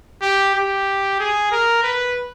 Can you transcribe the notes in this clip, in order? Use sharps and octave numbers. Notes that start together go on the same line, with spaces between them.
G4
G4
G#4
A#4
B4